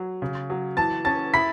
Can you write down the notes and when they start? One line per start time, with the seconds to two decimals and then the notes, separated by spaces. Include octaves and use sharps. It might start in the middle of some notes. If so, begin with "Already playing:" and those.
Already playing: F#3
0.22 C#3
0.50 F#3
0.77 E3 A5 A6
1.05 C#4 A5 A6
1.34 E4 B5 B6